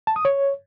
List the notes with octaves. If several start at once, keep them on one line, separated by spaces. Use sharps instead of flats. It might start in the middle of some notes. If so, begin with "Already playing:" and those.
A5
D#6
C#5